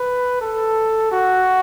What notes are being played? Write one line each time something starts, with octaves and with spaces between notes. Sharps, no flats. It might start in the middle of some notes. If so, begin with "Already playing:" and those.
Already playing: B4
A4
F#4